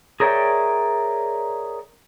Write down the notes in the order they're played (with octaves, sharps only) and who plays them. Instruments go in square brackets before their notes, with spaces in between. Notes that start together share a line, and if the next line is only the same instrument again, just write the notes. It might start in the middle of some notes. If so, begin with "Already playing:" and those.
[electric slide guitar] G#4 A#4 C#5 D5 E5 G5